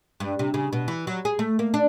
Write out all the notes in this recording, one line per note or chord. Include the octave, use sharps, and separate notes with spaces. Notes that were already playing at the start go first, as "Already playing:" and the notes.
G2
C3
C#3
B2
E3
F#3
G#4
A3
A#3
D4